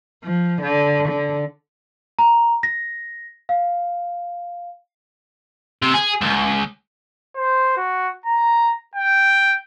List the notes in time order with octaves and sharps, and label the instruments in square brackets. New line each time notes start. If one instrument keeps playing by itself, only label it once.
[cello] F3
D3
D3
[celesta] A#5
A#6
F5
[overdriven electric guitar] C3
G#4
C#2
[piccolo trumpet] C5
F#4
A#5
G5